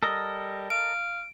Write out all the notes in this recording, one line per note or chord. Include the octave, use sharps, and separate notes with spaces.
G3 A4 A#4 D#5
F5 D7